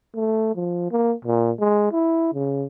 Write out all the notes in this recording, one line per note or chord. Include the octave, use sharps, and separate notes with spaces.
A3
F3
A#3
A#2
G#3
E4
C#3